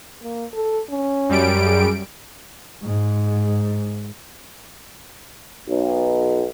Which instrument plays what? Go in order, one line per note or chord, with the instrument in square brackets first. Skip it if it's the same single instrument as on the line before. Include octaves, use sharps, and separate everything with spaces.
[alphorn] A#3
A4
C#4
[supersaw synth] F#2 G3 D7
[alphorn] G#4
[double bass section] G#2
[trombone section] B1